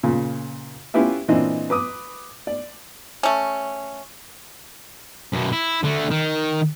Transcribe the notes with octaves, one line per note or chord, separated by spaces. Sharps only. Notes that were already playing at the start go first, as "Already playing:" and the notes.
A#2 C#3
C#4 E4 F4 G4 B4 E5
A#2 E3 C4 D4 D#5
B4 D6 D#6
D5
A3 C#4
F#2 B2
E4
D3 A3
D#3